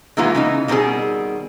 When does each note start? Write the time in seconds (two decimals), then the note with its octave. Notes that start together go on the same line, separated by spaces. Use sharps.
0.17 D#3 E3 G#3 A#3 B3 F4
0.35 C#3 E3 D#4
0.68 B2 D#3 G3 C4 G#4